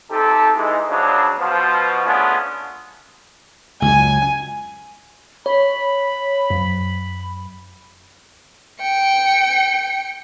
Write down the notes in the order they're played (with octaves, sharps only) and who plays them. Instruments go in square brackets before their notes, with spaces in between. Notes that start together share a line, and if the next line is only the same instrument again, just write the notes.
[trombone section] C3 D#4 G4 A4
E3 G#3 D#4
C#3 F3 F#3 D4
B2 F3
A3 B3 C#4 D4 F4 G#4
[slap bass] C#2 F#2 [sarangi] G#5
[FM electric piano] C#5 [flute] B5
[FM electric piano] F#2
[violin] G5 C#7